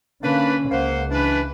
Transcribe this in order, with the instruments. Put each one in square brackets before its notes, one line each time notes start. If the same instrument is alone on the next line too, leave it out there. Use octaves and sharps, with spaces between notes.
[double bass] D3 C#4 [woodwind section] A#3 D4 B4
[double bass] C#2 [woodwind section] A#3 C5 F#5
[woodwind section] E3 D4 B4